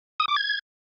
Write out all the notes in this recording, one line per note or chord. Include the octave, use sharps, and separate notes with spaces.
D#6
D6
G#6